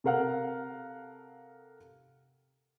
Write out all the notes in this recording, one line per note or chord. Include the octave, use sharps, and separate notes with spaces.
C3 A4 A#4 F5 F#5 F6